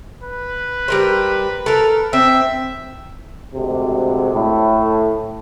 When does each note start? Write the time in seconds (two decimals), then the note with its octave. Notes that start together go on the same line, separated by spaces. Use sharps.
0.22 B4
0.88 G3 A#4 C5
1.66 A4 A#4
2.13 C4 E5
3.54 D2 C3 G#3
4.33 A2